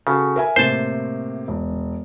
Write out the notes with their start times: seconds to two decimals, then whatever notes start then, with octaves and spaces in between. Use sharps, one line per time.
0.07 C#3 F#4 A4
0.36 A#4 E5 G#5
0.56 A2 C3 A#3 C5 A5
1.48 E1